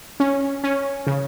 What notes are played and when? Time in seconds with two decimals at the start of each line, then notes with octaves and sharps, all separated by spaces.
0.20 C#4
0.64 C#4
1.07 C#3